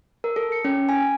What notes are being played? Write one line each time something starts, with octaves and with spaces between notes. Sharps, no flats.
A#4
A4
C#7
C#4
G#5